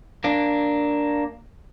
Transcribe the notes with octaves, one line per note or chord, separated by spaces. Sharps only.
A#3 D4